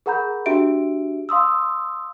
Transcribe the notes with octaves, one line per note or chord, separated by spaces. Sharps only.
G#4 A#4 F#5 A#5 B5 G6
D4 F#4 G4 E5 D7
F5 C6 D#6 E6